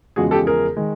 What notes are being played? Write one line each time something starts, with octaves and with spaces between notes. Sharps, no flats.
E2 C#3 F3 G#3 F#4 G#4
G4 A4
G#4 A#4
D#3 G#3